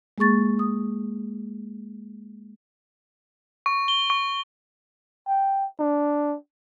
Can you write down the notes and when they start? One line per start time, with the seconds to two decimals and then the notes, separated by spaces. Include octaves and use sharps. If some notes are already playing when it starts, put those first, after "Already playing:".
0.18 G#3 A#3 G#4 C#6 A6
0.59 D#6
3.66 C#6
3.88 G7
4.10 C#6
5.28 G5
5.80 D4